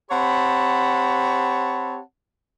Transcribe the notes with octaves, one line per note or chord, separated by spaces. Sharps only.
C4 G4 C#5 F#5 A5 B5